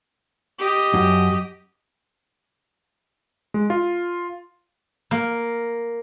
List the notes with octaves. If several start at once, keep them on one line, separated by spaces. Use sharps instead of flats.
G4 D#5
F#2
G#3
F4
A#3